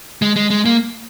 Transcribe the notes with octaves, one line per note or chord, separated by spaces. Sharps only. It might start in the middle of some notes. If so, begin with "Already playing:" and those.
G#3
G#3
G#3
A#3